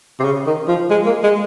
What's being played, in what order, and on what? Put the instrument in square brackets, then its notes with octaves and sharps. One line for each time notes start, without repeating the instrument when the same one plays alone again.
[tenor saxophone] C3
C#3
D#3
F3
G#3
A#3
G#3